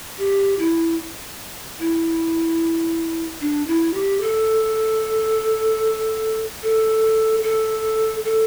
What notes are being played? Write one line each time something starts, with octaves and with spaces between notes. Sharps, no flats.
G4
E4
E4
D4
E4
G4
A4
A4
A4
A4